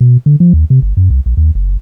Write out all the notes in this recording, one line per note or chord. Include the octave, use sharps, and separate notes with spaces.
B2
D3
F3
D#2
C3
G1
F#2
C2
A#1
D#2
F#1